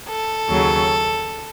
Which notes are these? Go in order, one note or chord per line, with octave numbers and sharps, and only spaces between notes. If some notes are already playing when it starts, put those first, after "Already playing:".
A4
D#2 C#3 F#3